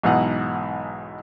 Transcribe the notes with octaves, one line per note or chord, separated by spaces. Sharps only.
B1 G#2 B2 E3 D#4 F#5